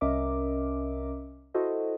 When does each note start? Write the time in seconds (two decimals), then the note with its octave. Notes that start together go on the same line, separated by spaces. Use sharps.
0.01 C2 C#4 A#4 D#5 E5 D6
1.54 E4 F#4 A4 C5 D#5